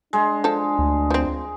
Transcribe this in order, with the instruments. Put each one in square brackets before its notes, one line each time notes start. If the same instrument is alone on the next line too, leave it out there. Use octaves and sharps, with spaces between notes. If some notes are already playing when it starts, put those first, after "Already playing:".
[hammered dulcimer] G#3 [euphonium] D4
[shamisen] F3 A4
[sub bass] D2
[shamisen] F3 C4